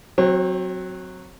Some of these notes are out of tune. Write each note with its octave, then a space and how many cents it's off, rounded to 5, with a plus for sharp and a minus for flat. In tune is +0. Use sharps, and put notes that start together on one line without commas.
F#3 +0 C4 +0 C#5 -40